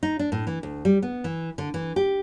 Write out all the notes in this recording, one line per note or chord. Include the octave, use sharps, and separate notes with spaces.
D#4
D4
A2
E3
D2
G3
B3
E3
D3
E3
G4